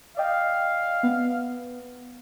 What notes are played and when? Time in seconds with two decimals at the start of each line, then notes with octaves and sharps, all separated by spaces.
0.17 D5 D#5 F5 G5
1.03 B3